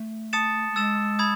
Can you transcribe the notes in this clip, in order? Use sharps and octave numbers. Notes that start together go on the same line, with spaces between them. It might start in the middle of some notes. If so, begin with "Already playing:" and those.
Already playing: A3
A5 D#6 A6 C#7 E7
A3
G#3 E6 A6 E7
B5 D#6 G#6